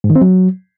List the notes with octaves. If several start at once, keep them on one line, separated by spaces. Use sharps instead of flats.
G#2
D#3
C4
F#3